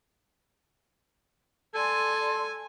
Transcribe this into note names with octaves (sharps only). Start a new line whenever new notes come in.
A4 D5 G#5 C6